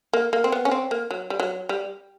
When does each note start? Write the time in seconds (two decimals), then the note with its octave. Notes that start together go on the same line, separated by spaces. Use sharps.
0.13 A#3
0.33 A#3
0.44 C4
0.52 B3
0.65 C#4
0.71 C4
0.91 A#3
1.11 F#3
1.30 G3
1.40 F#3
1.69 G3